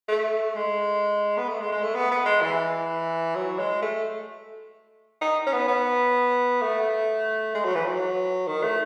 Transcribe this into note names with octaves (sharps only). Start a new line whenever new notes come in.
A3
G#3
B3
A3
G#3
G#3
A3
B3
B3
G#3
E3
F#3
G#3
A3
D#4
C#4
B3
B3
A3
G#3
F#3
E3
F#3
D#3
A3